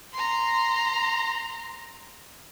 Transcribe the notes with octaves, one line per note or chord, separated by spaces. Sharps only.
A#5 C6